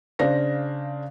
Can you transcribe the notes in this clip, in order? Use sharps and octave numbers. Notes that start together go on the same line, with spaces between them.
C#3 D4 C5 F5 A#6